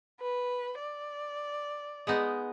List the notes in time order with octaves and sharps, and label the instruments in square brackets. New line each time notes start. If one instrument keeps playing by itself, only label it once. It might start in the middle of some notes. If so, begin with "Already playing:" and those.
[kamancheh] B4
D5
[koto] G#3 B3 D#4